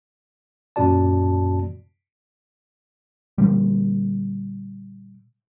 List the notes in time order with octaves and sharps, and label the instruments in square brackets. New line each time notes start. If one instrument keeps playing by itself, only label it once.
[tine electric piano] F#2 A#2 C#4 F#4 D5 A5
[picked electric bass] A#2 D3 G3